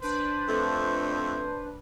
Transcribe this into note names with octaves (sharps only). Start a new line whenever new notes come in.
D4 B4 C5
F2 A3